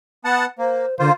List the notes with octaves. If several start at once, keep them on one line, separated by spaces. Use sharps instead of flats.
B3 F#5 A5
A#3 C5
D3 A#3 F4 C5